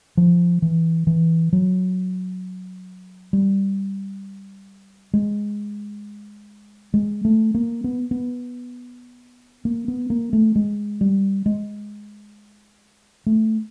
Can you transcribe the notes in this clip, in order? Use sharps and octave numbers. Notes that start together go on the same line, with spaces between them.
F3
E3
E3
F#3
G3
G#3
G#3
A3
A#3
B3
B3
A#3
B3
A#3
A3
G#3
G3
G#3
A3